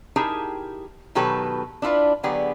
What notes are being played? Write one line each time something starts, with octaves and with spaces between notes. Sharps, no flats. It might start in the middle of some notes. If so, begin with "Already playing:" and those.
D#4 E4 G4 G#4 A#4 A5
B2 D#3 F#3 G4 A4 B4
D4 E4 F4 B4
D3 F#3 B3 G4 G#4 D5